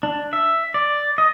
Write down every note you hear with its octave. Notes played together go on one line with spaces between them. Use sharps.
D4
E5
D5
D#5